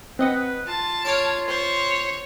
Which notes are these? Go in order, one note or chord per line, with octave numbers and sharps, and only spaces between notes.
C4 B4 D#5 F#5
F4 A5
C#5 F6 C7 D7
C5 C#5